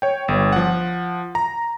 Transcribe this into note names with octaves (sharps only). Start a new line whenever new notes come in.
C#5 G5
G1
F3 F#5
A#5